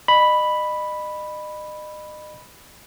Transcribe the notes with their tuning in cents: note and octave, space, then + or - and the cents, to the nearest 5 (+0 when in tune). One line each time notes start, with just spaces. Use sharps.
D#5 -35 B5 +0